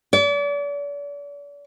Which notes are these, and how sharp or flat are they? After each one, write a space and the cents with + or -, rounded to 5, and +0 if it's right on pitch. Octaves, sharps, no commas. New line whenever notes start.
D5 -40